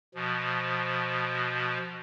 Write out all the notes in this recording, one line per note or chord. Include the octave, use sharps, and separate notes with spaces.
B2 F3